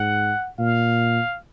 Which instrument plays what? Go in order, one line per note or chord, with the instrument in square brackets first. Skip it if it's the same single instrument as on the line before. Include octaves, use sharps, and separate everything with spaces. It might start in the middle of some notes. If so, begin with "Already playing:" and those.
Already playing: [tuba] G#2 [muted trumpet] F#5
[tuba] A#2 [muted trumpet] F5